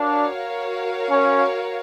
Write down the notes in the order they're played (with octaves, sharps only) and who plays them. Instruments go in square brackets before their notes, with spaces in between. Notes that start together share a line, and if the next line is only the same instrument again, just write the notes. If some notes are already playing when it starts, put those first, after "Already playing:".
Already playing: [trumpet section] D4 [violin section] F#4 A#4 C#5 F5
[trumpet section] C#4